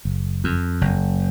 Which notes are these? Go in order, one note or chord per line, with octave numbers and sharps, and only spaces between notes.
F#1
F2
F#1